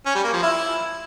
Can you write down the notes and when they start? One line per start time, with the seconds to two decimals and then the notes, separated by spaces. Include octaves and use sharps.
0.06 C#4
0.15 G3
0.24 A#3
0.33 F3
0.42 E4